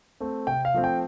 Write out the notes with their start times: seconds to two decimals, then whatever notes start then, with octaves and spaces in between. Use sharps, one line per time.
0.20 A3 C4
0.47 C3 G5
0.65 F5
0.74 F3 A3 C4
0.84 G5